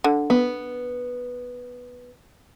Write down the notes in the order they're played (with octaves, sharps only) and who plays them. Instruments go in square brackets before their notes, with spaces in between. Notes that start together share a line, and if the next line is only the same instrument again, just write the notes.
[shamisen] D3
[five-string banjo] B3